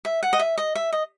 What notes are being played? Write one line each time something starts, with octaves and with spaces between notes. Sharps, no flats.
E5
F#5
D#5
E5
D#5
E5
D#5